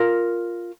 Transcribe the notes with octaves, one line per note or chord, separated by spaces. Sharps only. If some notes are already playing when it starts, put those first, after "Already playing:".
Already playing: F4 A#4